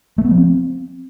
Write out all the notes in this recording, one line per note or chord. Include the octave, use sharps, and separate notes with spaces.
A3
B3
F3
C4